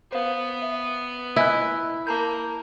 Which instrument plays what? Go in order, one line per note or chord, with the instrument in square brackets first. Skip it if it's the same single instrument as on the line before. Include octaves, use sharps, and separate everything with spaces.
[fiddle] B3 [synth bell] C5 F5
[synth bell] E5
[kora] E4 [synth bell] D#5 G#5 F#6
[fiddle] A#3 [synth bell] A5 A#5 G6